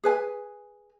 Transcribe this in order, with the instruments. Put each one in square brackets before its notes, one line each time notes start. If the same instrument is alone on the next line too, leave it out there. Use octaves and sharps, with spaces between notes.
[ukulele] G#4 B4 G#5